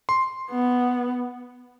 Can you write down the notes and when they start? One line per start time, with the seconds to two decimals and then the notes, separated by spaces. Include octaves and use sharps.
0.09 C6
0.51 B3